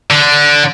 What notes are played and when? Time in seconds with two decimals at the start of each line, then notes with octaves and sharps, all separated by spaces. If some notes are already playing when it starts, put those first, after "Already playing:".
0.11 D3